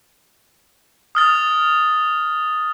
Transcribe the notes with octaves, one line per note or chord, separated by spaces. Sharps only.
D#6 F6 A6